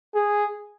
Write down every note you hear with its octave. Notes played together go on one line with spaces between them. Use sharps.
G#4